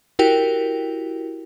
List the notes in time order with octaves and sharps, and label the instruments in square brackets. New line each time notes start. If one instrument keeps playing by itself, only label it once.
[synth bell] E4 F#4 G4 A#4 G5